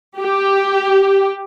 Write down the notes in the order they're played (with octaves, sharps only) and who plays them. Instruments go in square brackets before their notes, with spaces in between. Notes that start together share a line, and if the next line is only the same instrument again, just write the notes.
[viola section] G4